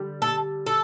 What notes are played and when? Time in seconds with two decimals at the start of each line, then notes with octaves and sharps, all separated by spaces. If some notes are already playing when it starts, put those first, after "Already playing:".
Already playing: D3 G3
0.22 A4
0.66 A4